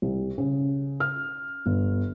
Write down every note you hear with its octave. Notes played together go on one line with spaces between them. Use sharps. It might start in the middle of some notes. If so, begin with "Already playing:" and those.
C2
C#3
F6
G1